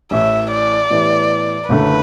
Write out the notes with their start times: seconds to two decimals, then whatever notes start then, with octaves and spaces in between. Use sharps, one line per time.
0.11 A1 A2 E3 E5
0.52 D5
0.90 A2 E3 B3 E4 G4
1.69 F#1 F#2 D3 A3 B4